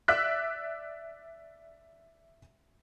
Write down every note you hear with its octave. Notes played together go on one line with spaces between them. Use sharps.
D5 E5 E6 F#6 B6